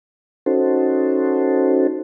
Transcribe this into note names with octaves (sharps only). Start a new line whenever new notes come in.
C#4 D#4 F#4 A4 C5